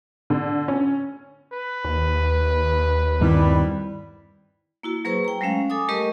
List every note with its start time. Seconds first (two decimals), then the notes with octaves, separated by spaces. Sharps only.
0.30 D3
0.68 C#4
1.53 B4
1.85 D#2
3.21 G2 D#3 G3 C4 E4
4.83 A#3 E4 F#4
5.05 F#3 A#3 G#4 B4 C5 C#6
5.25 G5 A#5
5.41 F#3 G#3 A3 C#4 F5
5.70 A4 G#5 D6 D#6
5.89 G3 A3 G4 A#4 D#5 C#6